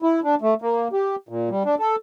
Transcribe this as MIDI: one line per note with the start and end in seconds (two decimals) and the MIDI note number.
0.02 0.20 64
0.24 0.35 62
0.42 0.54 57
0.62 0.88 58
0.93 1.16 67
1.29 1.49 46
1.50 1.63 55
1.65 1.75 62
1.79 1.96 69